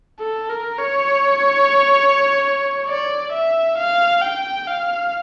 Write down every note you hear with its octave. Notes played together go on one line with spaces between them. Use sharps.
A4
A#4
C#5
D5
E5
F5
G5
F5